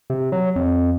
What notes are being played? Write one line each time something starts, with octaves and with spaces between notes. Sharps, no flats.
C3
F#3
F2